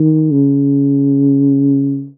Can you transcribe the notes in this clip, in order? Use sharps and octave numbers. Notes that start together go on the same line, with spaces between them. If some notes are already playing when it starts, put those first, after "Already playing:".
Already playing: D#3
C#3